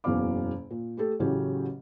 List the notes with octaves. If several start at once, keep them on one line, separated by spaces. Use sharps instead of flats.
F#1 E2 B2 C#4 F5 D6
A#2
A3 G4 A4
A1 A2 C#3 F#3 C#4 G4